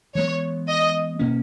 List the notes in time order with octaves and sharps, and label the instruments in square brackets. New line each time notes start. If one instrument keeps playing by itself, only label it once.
[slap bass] E3 G#3 B3 [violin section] C#5
[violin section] D#5
[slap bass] B2 A#3 C#4